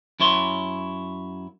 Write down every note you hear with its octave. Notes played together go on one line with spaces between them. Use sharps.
F#2 E4 C#5 C6